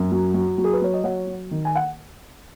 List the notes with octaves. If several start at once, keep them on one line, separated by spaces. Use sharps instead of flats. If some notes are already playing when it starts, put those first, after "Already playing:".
Already playing: F#2
F#3
F#3
F#3
G#4
B4
F#3 C#5
D#5
F#3 C#5 F#5
F#3
D#3
G#5
F#5